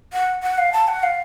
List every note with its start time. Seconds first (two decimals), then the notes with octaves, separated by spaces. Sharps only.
0.13 F#5
0.43 F#5
0.58 F5
0.73 A5
0.88 F#5
1.03 F5